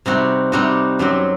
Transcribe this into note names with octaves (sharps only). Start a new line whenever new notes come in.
C3 G3 C4 D#4 F#4
C3 G3 C4 D#4 F#4
F#2 F#3 C4 F#4